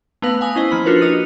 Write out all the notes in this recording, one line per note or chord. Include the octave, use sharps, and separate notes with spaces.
A3 B3 B4 F5 A#6 F#7
F5 G#5 D#6
C#4 E4 C5 D#5
F3 A#3 B5 F#7
D4 F4 F#4 A#4 B4
F#4 D#5 D#6 D#7 F7